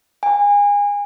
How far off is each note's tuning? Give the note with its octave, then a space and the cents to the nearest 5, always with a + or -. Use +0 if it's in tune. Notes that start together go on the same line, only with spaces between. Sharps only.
G#5 -30